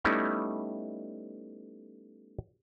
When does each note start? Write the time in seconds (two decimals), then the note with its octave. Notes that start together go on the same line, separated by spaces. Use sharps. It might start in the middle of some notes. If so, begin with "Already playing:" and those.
0.05 G3 A3 B3 C#4 D#4 E4